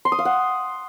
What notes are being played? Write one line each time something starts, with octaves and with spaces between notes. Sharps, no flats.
C6
D#6
F5
F#5